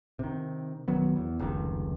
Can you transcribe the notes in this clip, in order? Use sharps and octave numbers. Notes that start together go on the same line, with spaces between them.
C3 D#3
B1 D#3 F#3 B3
E2
F1 C#2 D#3